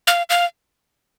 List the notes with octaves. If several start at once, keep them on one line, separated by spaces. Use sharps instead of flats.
F5
F5